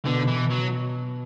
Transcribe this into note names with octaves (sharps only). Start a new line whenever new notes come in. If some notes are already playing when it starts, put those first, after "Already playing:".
B2 D3
E3
F#3